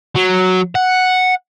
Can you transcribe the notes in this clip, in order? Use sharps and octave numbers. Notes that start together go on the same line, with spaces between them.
F#3
F#5